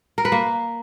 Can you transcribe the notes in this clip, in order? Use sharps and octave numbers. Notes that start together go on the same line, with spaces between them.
A#4
B4
A#3